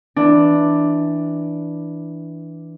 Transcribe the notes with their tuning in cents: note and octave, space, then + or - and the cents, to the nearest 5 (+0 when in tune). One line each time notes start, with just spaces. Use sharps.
E3 -5 D4 +0